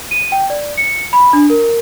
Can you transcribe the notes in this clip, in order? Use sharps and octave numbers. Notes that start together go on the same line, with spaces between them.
D#7
G5
D5
C#7
B5
D4
A#4